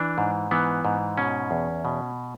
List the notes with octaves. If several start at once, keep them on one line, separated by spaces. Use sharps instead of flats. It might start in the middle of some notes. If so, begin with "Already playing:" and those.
Already playing: E3 D4
G#2
E3 B3
G#2
B2 C#4
E2
B2